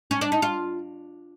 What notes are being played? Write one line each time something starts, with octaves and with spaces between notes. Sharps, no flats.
C#4
D4
D#4
F4